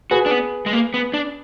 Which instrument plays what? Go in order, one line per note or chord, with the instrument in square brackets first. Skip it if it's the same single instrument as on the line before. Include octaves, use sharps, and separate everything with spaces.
[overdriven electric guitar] F#4 [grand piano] G#4 B4
[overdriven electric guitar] D4
B3
G#3
A#3
B3
D4